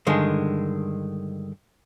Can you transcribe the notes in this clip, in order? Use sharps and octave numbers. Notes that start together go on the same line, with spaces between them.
G2 D3 D#3 G#3